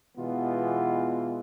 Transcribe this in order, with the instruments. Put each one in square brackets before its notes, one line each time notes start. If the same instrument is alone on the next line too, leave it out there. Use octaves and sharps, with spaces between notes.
[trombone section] B2 E3 G#3 B3 F4